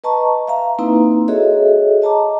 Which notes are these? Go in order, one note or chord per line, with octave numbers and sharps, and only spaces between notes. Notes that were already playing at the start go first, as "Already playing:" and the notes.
B4 D#5 A5 A#5 C#6
E5 F5 A#5
A#3 C4 D#4 E4 B4 A#5
F#4 G#4 A4 C#5 D#5 E5
D#5 A5 A#5 D6